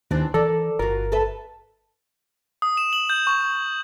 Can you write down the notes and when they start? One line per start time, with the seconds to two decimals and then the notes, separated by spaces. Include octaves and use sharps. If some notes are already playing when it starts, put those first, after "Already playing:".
0.11 D#2 E3 C4 D4
0.34 E3 A4 A#4 D5
0.79 G1 F4 F#4 A#4
1.12 A4 B4 E5
2.62 D#6
2.77 E7
2.93 F#7
3.10 G6
3.27 C#6